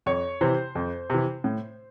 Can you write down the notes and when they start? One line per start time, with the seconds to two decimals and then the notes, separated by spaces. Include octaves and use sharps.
0.06 F2 C#5
0.41 C3 E3 C5
0.75 F2
1.10 C3 E3
1.44 A2